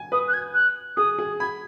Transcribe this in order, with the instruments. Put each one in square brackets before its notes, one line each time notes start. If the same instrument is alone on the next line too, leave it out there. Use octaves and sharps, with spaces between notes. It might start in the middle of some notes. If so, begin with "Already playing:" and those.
Already playing: [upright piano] G#5
[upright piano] B4 [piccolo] D#6
[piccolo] F#6
G#6
F#6
[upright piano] G#4 [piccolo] D#6
[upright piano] G#4
[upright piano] B5 [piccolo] G#6